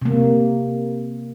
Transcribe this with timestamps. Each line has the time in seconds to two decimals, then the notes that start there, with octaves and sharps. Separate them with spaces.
0.02 C3 A#3